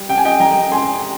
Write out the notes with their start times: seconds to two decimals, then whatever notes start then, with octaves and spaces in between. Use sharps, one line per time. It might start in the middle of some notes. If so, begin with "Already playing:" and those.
Already playing: G3
0.09 C3 G5
0.17 G#5
0.25 D#5 G5
0.40 C2 G5 A#5
0.71 G#3 G#5 C6